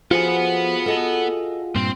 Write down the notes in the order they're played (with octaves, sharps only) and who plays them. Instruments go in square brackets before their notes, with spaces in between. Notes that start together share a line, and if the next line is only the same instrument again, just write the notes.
[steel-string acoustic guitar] F3 A4 [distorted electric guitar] B3 F#5 [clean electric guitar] F4 F#4 G#4
[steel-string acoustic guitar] A4 D#5 A5
[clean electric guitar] G2 A#2 [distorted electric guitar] C4